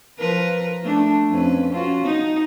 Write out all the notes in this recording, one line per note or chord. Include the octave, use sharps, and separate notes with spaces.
F3 A#4 B4
A3 D4
F2 C#4 B4
C#4 F4 F#4
D#4